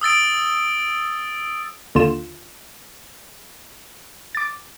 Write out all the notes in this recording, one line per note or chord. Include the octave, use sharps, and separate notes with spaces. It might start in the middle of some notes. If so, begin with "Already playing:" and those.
D#6 E6 A6 D7
D#2 D3 F4 E7
D6 A6